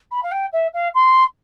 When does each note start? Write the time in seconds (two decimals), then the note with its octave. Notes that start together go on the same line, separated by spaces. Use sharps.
0.11 B5
0.23 F5
0.31 G5
0.52 E5
0.73 F5
0.94 C6